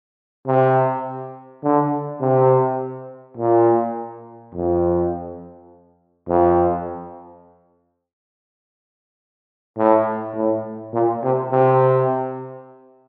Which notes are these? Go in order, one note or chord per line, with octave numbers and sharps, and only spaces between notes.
C3
D3
C3
A#2
F2
F2
A2
A2
A#2
C3
C3